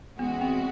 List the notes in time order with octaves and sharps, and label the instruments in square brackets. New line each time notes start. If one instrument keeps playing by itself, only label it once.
[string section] E3 G#3 C#4 F#4 [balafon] B3
[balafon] C4